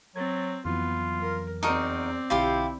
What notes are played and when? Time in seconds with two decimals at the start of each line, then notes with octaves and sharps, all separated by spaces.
0.16 F#3 C4 G#6 A6
0.65 F2 E3 F#3 B3 F4
1.21 A#4
1.63 E2 C4 D#4 F#4 A#4 D5
2.30 B1 D3 E4 F4 G4 C6 G6